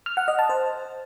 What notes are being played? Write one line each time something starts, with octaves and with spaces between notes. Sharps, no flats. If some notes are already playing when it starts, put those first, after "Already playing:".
F6
F#5
D#5
A5
C5